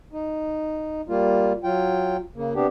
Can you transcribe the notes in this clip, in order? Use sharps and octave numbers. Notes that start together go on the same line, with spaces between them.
D#4
G3 A#3 F4
F#3 F4 G5
C#3 A#3
C3 B3 D4 G4